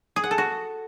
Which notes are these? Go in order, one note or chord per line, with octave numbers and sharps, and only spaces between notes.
G#4
F#5
A4
F#4